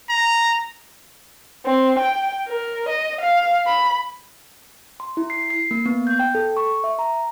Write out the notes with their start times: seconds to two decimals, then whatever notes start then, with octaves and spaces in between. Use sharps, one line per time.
0.10 A#5
1.66 C4
1.99 G5
2.48 A#4
2.89 D#5
3.21 F5
3.66 B5
5.00 C6
5.17 E4
5.30 C7
5.50 C7
5.71 A#3
5.86 B3
6.07 G6
6.19 G5
6.35 A4
6.57 C#6
6.84 E5
6.99 A#5